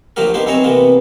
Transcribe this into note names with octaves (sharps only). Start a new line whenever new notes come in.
D2 F3 F#3 A#3 G4 A#4
A#3 B3 D#4 G4 C5
E3 C4 D#4 C#5 A#5
C3 E3 A#3 B3